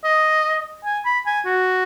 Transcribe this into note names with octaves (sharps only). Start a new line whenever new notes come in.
D#5
G#5
B5
G#5
F#4